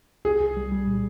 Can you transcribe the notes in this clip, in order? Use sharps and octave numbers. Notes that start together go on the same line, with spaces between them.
C2 G#4
C2
G3
G3
A#2